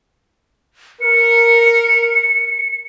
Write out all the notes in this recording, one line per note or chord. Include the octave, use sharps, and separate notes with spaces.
A#4 C#7